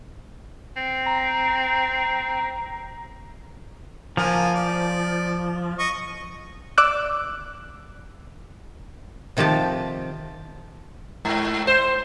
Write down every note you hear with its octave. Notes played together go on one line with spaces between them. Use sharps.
C4
A#5
F3 A#3 G#5
D5
D#5 C#6
D5 D6 E6 F#6
C3 D#3 F3 G4 A5
G#2
C5